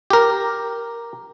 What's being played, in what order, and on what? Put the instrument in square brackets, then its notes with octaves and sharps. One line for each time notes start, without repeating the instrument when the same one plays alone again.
[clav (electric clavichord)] G4 A#4